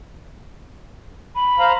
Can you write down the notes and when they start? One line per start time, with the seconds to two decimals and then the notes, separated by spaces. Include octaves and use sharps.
1.36 B5
1.59 C5 F5 A#5